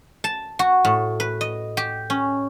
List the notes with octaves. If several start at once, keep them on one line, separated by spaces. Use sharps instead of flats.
A5
F#4
A2
B4
D#5
G4
C#4